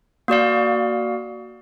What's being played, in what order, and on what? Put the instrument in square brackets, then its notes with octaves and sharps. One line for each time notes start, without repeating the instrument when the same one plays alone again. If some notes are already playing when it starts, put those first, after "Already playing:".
[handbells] A#3 F#4 D5 F5